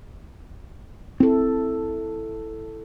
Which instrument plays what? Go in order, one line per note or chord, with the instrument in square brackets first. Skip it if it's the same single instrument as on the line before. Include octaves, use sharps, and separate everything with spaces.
[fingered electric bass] C4 [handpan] E4 A4